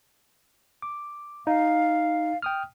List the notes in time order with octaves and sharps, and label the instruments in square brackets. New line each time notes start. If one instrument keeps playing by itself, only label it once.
[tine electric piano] D6
[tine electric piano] D#4 [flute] F5
[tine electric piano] G5 D#6 F6